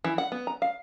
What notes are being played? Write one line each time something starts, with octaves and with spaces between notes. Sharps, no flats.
E3
F#5
B3
A#5
F5